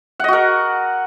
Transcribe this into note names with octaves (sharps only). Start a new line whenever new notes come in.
F#4 A#4 D#5 F#5